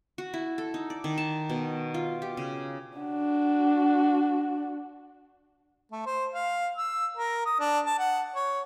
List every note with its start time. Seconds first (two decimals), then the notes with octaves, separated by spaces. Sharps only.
0.18 F#4
0.34 E4
0.58 A4
0.74 D#4
0.90 D5
1.04 D#3
1.18 A5
1.50 B2
1.94 F4
2.22 G4
2.37 C#3
2.99 D4 F#4
5.92 A3
6.06 C5
6.34 F5
6.77 E6
7.17 A#4
7.46 D#6
7.59 D4
7.86 A5
7.99 F#5
8.35 C#5